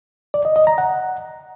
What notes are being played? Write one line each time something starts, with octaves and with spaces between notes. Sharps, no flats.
D5
D#5
D#5
A#5
F#5